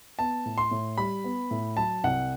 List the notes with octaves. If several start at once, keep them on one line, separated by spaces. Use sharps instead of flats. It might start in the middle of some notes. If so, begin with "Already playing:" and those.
B3 A5
A2
C6
A2
G3 B5
B3
A2
F#3 A5
C2 F#5